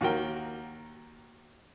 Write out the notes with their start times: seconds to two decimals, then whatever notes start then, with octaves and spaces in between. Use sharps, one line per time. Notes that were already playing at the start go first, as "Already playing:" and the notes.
0.01 D#2 F#4 A#4 G5